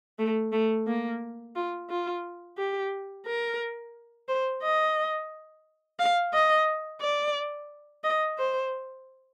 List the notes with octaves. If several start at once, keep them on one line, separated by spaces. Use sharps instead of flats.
A3
A3
A#3
F4
F4
G4
A#4
C5
D#5
F5
D#5
D5
D#5
C5